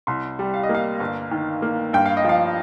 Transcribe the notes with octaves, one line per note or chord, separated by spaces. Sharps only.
C2 C6
G3
F5
D#5
A#3
F5
G1
D#3
A#3
G2 G5
F5
D#5
F3 F5